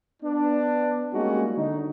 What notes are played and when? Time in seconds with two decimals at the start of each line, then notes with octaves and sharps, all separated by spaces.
0.23 B3 D4
1.14 G3 G#3 A#3 C#4 D#4 F#4
1.57 D3 D#4